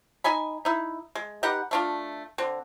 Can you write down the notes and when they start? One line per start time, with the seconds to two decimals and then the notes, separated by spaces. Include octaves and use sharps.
0.24 D#4 D#5 G#5 B5
0.65 D#4 E4
1.15 G#3
1.43 D#4 G4 B4 F#5
1.71 A3 D4 F4
2.38 D3 C4